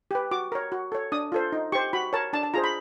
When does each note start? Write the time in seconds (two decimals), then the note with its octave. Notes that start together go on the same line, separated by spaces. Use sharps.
0.11 G4 B4
0.31 F#4 D6
0.52 A#4 C#5
0.72 F#4
0.92 A4 C#5
1.12 D4 D#6
1.32 F4 A4 C5
1.52 D#4
1.72 G4 C5 C#6
1.93 F#4 B5
2.13 A#4 C#5 A5
2.33 D4 A5
2.43 A5
2.54 F4 G#4 C5 A#5
2.64 B5